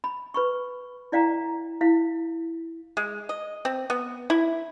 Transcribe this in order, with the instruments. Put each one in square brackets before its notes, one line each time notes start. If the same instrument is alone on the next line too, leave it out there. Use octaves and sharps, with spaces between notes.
[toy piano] B5
B4 B5 C#6
E4 D5 F5 G5 A#5
E4 F5
[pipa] G#3
D#5
C4
B3
E4